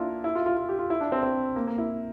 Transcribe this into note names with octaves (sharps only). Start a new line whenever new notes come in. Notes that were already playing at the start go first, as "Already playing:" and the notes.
Already playing: A#3 D4 E4 F4
E4
F4
F4
F4
G4
F4
E4
D4
C4
C4
A#3
A#3
E4